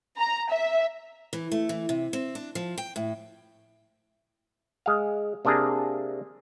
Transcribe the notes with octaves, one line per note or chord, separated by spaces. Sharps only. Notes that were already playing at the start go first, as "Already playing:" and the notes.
A#5
E5
E3
A3
E3
C3
C4
D4
F3
G5
A2
G#3 F5
C3 A#3 D4 G#4 A#5